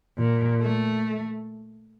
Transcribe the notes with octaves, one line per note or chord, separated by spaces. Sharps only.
A#2
A3